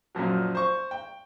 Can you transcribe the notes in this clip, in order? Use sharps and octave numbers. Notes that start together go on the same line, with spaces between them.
F#2 A#2 F3 F#3
C5 C#6
G5